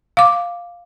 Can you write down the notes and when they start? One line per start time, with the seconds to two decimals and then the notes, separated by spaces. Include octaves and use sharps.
0.17 F5 D6